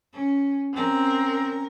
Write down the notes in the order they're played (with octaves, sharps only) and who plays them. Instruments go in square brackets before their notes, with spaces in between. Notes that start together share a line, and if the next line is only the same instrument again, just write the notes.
[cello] C#4
[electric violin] C4 [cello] C#4 A#4